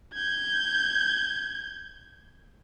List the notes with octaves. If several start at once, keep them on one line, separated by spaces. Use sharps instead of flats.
G6 G#6